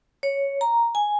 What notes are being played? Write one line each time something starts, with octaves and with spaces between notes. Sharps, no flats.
C#5
A#5
G#5